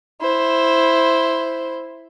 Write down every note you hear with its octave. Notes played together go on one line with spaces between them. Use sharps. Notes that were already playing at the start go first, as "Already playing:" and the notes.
E4 C5